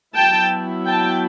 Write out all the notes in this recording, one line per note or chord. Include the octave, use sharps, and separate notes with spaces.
F#3 B3 E4 G5 A5
G5 A5